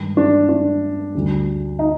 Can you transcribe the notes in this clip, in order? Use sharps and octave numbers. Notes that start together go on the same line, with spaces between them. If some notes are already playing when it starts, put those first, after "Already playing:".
Already playing: G2 D#3 G#3
D4
D4
D2 D3 G3
D#4